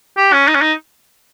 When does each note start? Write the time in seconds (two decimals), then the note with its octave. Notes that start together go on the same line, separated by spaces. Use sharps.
0.17 G4
0.33 C#4
0.48 D#4
0.55 C#4
0.61 D#4